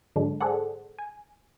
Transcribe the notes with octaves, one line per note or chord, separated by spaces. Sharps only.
G#2 D3 F#3 G#3 D4
G#4 A4 C5 D5 F#5
G#5